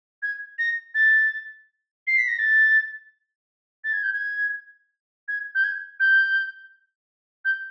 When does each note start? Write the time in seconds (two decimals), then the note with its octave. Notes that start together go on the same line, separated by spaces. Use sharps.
0.22 G#6
0.59 A#6
0.95 A6
2.07 C7
2.18 B6
2.28 A#6
2.39 A6
3.84 A6
3.93 G#6
4.03 G6
4.13 G#6
5.28 G#6
5.55 G6
5.64 G#6
6.00 G6
7.45 G6